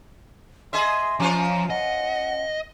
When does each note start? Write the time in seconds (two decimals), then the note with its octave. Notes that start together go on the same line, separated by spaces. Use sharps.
0.73 G#4 D#5 E5 C6
1.20 F3 C#4 F4 C5 A#5
1.70 D#5 F#5